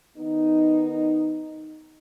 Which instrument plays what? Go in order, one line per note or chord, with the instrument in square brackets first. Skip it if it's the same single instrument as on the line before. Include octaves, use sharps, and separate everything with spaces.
[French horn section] D#3 B3 D#4